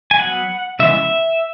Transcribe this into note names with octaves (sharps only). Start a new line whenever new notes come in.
G#5
F#3 B3 F#5
C#3 E3 G#3 B3 E5
E5